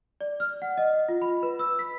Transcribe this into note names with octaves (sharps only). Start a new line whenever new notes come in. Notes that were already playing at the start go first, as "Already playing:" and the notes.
D5
F6
F#5
D#5
F4
B5
B4
E6
B6